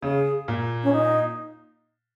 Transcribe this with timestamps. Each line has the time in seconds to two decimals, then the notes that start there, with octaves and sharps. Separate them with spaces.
0.03 C#3 G#4
0.48 A#2
0.83 C#4
0.93 D#4